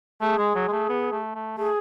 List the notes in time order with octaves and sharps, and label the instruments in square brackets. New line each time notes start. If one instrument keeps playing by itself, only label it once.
[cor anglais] A3 [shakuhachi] G#4
[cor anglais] G#3
F#3
G#3
A3
B3
A3
A3
[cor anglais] A3 [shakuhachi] G#4